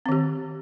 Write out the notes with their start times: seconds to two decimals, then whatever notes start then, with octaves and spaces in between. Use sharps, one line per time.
0.06 C4
0.09 D#3
0.12 G4